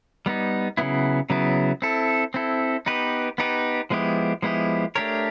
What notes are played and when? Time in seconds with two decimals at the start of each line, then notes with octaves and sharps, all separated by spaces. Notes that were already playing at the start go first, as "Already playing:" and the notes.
0.26 G3 B3 D#4
0.77 C#3 F#3 B3 E4
1.30 C#3 F#3 B3 E4
1.82 C4 E4 A4
2.34 C4 E4 A4
2.86 B3 D#4 G4 B4
3.38 B3 D#4 G4 B4
3.90 F3 G#3 B3 E4 G4
4.42 F3 G#3 B3 E4 G4
4.95 A3 D4 G4 A#4 C#5